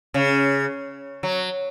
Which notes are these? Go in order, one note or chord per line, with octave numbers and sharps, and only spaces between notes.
C#3
F#3